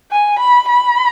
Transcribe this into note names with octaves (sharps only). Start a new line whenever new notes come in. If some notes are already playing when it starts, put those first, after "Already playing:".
G#5
B5
B5